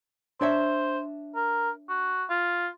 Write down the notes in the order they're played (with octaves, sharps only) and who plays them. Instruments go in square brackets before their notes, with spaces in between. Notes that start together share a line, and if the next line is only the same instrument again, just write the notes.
[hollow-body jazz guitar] D4 C#5 E5 [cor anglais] C5
[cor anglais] A#4
F#4
F4